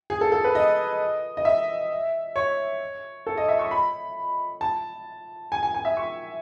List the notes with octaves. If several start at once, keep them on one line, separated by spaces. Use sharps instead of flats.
G#4
A4
A4
B4
D#5
D#5
E5
C#5
A4
D#5
E5
C#6
B5
A5
G#5
G#5
G#5
E5
C#6